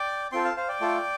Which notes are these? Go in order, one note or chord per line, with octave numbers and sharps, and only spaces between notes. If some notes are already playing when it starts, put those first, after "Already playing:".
Already playing: D5 G5
C4 F4 A4 G5 C6
F5 A5
C5 F5
D5 G5
A3 F4 A4